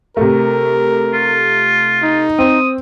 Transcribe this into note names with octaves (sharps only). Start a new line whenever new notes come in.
C3 A3 A#4
F4
D#4
C4 D#6